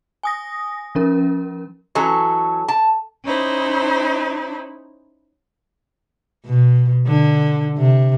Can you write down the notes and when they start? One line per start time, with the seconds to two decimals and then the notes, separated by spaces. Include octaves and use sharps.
0.23 G#5 D#6 A#6
0.95 F3 C#4 A#4
1.95 E3 F#3 C#4 A4
2.68 A5
3.24 C#4 D#4 E4 C5
6.46 B2
7.06 D3
7.77 C3